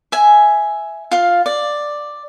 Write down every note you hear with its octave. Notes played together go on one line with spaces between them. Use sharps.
E5 G#5
F4 F5
D5